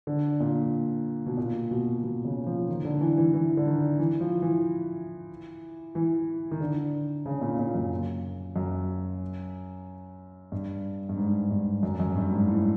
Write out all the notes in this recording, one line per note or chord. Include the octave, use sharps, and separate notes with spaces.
D3
A#2
B2
A#2
B2
B2
C#3
F3
D#3
D3
E3
E3
E3
D3
D#3
E3
F3
E3
E3
D#3
D3
C#3
A#2
A#2
F#2
F#2
G2
G2
G#2
G2
F#2
F#2
G2
G#2
A2